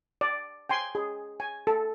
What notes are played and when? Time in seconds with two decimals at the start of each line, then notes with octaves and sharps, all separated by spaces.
0.21 D5
0.69 G5 G#5 C6
0.95 G#4
1.40 G#5
1.67 A4